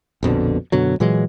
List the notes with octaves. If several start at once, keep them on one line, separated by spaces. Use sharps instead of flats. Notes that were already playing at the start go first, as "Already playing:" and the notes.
A#1 F2 B2 D3
F#2 B2 D3 F#3
A#2 E3 F#3 G#3